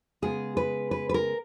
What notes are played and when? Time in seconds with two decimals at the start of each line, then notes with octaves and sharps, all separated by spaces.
0.22 C#3 G#3 B3 G#4
0.57 B4
0.91 B4
1.09 B4
1.14 A#4